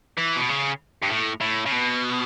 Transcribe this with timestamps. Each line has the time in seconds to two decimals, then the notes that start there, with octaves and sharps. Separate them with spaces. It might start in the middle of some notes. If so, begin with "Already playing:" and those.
0.18 E3
0.36 B2
0.49 C#3
1.02 G2
1.10 A2
1.41 A2
1.66 C#3
1.72 B2